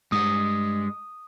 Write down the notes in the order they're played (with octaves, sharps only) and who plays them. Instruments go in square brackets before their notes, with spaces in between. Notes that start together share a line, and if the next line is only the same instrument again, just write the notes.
[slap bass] G2 [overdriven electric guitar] G#3 F#5 [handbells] D#6